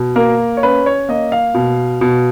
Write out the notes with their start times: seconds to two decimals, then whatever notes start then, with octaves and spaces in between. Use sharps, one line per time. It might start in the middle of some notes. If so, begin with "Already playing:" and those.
Already playing: B2
0.16 A#3 A#4
0.57 C#5
0.63 C#4 B4
0.86 C#5
1.09 A#3 D#5
1.32 F5
1.54 B2
2.01 B2